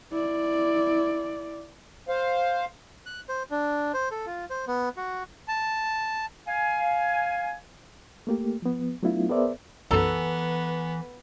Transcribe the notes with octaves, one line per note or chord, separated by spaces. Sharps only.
E4 D5
C5 F5
F#6
C5
D4
C5
A4
F4
C5
B3
F#4
A5
F5 G#5
A3 A#3 G4
F3 B3
F#3 A3 B3 D4 E4 F4
B3 G#4 A#4 C5 D5 E5
B1 F#2 E3 B3 A4 A#5